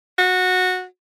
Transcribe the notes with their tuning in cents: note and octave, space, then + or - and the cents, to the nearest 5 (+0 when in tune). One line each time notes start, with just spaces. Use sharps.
F#4 -15